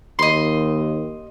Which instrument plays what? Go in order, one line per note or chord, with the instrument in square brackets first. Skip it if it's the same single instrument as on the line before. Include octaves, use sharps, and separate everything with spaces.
[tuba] D#2 [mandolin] D#5 C6